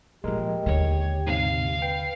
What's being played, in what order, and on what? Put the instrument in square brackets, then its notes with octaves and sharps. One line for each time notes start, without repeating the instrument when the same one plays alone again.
[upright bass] A#2 F3 [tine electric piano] G#3 A#4 [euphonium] G4
[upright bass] D#2 D3 [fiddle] C#5
[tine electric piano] G#2 C3 [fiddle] F5
[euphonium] B4 [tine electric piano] G5